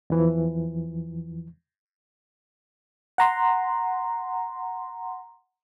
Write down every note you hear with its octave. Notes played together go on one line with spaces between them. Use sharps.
E2 E3 F3
F#5 A#5 C6